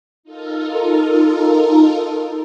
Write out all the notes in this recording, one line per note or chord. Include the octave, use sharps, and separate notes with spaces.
D#4 F4 A4 A#4